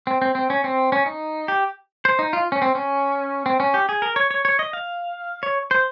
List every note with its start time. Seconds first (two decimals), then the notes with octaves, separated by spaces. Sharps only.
0.07 C4
0.22 C4
0.35 C4
0.50 C#4
0.64 C4
0.92 C#4
1.06 D#4
1.48 G4
2.05 C5
2.19 D#4
2.33 F4
2.52 C#4
2.62 C4
2.75 C#4
3.46 C4
3.60 C#4
3.74 G4
3.89 G#4
4.02 A#4
4.16 C#5
4.31 C#5
4.45 C#5
4.59 D#5
4.73 F5
5.43 C#5
5.71 C5